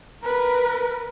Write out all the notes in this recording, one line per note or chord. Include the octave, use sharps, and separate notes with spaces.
A#4 B4